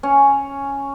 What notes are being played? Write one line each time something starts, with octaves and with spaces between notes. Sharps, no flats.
C#4